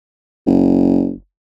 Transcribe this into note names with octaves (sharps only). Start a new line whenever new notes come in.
F#1